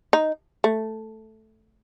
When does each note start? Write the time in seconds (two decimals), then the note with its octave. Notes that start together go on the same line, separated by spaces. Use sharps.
0.13 D#4
0.64 A3